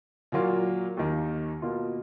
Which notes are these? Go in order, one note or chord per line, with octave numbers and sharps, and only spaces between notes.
A#2 F#3 A#3 F4
D#2 D#3 A#3
B2 A#3 F4